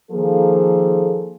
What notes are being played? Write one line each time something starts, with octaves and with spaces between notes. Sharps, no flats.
D#3 F3 A#3 G#4 A4